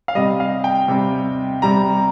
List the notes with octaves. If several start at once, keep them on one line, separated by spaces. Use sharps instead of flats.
F5
C3 G3 D#5
F5
G5
C3 G3
C3 G3 A#5